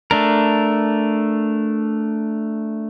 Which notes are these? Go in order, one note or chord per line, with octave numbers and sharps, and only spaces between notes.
A3 D4 A#4